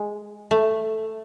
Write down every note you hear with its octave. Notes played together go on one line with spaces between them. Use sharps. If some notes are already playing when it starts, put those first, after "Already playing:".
Already playing: G#3
A3